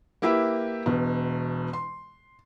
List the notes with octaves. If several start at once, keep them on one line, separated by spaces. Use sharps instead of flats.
A#3 E4 G4 B4 E5
E1 B2
C6